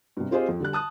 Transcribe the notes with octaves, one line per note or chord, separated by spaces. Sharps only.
G2 C3
C4 F4 G4 G#4 C5 D#5
F2
D3 G3 F#6
A5 D#6 F#6